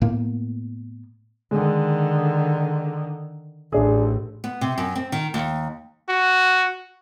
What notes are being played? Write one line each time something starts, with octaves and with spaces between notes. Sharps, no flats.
A2 A#3 B3
D3 D#3 G#3
A1 D4 G#4
B3
C3
F#2
C4
D#3
D#2
F#4